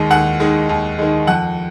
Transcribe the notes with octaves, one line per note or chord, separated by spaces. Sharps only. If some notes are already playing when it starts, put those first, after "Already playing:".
Already playing: D#2 D#3 G#3
D#2 F#5 F#6
D#3 G#3
D#2
D#3 G#3
F2 F#5 F#6